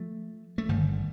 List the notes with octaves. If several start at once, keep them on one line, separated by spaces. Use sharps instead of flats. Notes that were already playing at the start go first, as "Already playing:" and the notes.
Already playing: F3 A3
A3
G1 G2 D3 D#3 G3